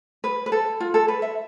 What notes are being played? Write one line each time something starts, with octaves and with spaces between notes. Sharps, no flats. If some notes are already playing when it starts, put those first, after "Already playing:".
B4
B4
A4
F4
A4
B4
E5